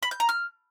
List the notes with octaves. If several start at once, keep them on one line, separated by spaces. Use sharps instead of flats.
B5
G6
A#5
F6